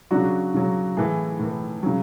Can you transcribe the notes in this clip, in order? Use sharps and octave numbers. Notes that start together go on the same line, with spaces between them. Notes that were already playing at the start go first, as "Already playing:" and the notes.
C#3 F#3 D4 F#4
C#3 F#3
A2 E3 E4 G#4
A2 E3
C#3 F#3